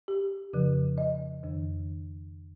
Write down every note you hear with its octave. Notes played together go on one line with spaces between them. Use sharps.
G4
F2 C#3 F3
D#5
F2 D#3